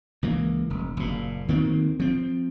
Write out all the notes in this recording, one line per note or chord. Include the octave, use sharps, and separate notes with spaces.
C#2 E3 A#3
F1
F#1 A#2
D2 D#3 A#3 C4
F3 C4